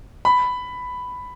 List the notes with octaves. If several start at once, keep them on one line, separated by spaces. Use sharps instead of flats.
B5